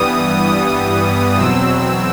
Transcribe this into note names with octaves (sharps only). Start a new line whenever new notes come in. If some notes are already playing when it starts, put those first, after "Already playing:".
Already playing: G2 E3 G3 B3 D#6
D#6
E2 B2 F#3 C4 E6